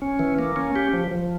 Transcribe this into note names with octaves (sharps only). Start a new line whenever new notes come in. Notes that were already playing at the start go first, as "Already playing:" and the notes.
C#4
E3
A#3
C#4
G4
F3
F3